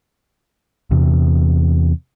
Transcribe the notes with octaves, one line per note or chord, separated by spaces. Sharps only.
E2 C3